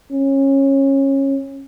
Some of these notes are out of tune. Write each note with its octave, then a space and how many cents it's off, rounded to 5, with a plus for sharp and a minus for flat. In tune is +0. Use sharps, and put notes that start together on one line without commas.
C#4 -25